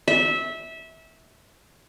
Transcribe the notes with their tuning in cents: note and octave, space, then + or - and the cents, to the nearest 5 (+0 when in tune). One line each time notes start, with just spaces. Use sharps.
E5 -20